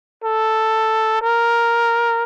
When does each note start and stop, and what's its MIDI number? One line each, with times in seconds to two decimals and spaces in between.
0.24 1.21 69
1.22 2.24 70